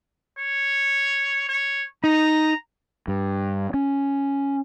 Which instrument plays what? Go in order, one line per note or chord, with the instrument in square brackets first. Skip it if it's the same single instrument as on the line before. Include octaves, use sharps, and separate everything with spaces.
[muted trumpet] C#5
C#5
[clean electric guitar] D#4 [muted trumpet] A#5
[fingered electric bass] G2
C#4